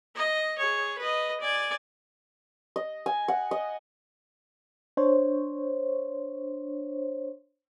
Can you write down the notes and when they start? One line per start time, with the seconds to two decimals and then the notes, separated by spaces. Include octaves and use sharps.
0.16 D#5
0.58 G#4 C#5
0.98 B4 D#5
1.40 D5 G#5
2.76 D#5
3.06 G#5
3.28 F#5
3.51 D#5
4.97 D4 C5 C#5